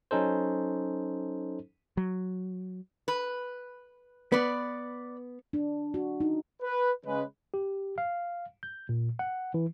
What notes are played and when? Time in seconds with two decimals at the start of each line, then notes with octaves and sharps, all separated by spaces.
0.11 F#3 C#4 D#4 A4 C5
1.97 F#3
3.08 B4
4.32 B3 B4 D5
5.53 D4
5.94 F#4
6.20 D#4
6.62 B4
7.06 C#3 G#3 B4
7.54 G4
7.98 F5
8.63 G6
8.89 A#2
9.19 F#5
9.54 E3